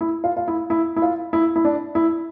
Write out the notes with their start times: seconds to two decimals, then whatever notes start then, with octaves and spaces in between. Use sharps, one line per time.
0.01 E4
0.24 F4
0.37 F4
0.48 E4
0.70 E4
0.96 E4
1.02 F4
1.33 E4
1.56 E4
1.65 D4
1.95 E4